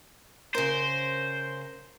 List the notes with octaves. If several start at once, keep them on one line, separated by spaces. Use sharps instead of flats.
C#3 A#4 C5